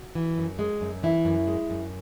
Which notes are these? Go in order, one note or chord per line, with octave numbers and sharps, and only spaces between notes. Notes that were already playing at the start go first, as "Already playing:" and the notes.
Already playing: F#4
E3
F#2
G#3
F#2
E3 E4
F#2
G#3
F#2